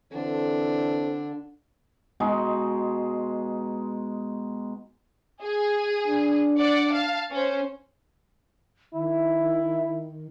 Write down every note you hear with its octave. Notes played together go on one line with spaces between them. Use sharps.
D3 E3 C4 D4 A4
B2 G#3 D#4 C6
G#4
D4
D5 F#5
F5 A5
C#4 C5
D#3 E4